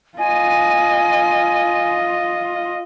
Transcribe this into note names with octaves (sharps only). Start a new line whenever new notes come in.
F4 D#5 G#5